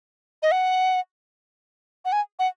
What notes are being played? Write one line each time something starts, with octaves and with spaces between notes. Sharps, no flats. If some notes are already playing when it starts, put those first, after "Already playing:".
D#5
F#5
F#5
G#5
F#5